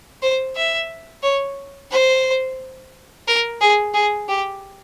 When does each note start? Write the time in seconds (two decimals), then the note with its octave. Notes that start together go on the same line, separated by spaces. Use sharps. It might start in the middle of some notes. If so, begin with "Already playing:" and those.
0.22 C5
0.56 E5
1.23 C#5
1.91 C5
3.27 A#4
3.61 G#4
3.94 G#4
4.29 G4